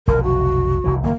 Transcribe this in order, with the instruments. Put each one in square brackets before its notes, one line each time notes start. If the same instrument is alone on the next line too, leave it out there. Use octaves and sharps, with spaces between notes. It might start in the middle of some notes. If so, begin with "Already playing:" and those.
[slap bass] F1 B1 D3 [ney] A#4
[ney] F#4
[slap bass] F1 C2 E3
[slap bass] F#1 D#3 F#3 [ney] A#3